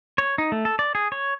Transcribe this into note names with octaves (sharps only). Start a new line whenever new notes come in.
C#5
D#4
A3
A4
D5
G#4
C#5